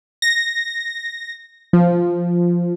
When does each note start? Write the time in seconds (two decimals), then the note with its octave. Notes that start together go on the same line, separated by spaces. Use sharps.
0.22 A#6
1.73 F3